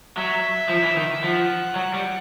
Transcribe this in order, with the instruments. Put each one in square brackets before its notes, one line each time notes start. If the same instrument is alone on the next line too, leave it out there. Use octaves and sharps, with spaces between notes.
[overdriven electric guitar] F#3 [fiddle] E5
[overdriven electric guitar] F3
E3
D#3
[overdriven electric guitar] F3 [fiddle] F#5
[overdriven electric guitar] F#3
G3